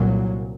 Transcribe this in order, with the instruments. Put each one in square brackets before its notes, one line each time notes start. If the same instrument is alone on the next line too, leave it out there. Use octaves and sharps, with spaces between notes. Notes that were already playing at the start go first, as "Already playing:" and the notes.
Already playing: [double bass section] C2 A#2 F#3